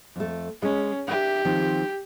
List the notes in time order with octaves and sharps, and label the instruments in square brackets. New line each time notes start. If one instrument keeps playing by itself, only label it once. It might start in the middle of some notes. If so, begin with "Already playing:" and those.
[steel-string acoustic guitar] F2 A3
[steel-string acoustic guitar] G#3 [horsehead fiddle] C#4
[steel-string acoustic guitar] D4 A#4 E5 [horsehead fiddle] G4
[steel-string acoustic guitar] D#3 F3 C4